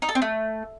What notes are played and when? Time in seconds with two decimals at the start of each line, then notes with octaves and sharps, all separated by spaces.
0.02 D#4
0.09 A4
0.15 C4
0.22 A3